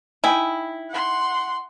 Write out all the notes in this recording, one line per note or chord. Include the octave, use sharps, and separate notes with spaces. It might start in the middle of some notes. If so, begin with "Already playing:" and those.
D#4 E4 G5 G#5
F#5 C6